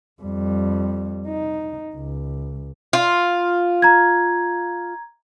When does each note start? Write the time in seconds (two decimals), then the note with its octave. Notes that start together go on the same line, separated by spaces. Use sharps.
0.22 F2 G3
1.27 D#4
1.95 C#2
2.93 F4
3.82 A#5 G#6